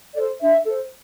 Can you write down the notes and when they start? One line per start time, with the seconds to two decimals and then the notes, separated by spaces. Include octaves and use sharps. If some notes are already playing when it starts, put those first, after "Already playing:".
0.15 A4 D5
0.20 C5
0.41 D4 E5
0.65 A4 C5